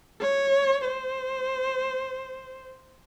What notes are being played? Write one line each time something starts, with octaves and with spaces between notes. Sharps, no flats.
C#5
C5